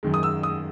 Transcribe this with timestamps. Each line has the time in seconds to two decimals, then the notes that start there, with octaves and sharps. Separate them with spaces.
0.03 F#2 D#3 G#3
0.14 D#6
0.23 E6
0.43 D#6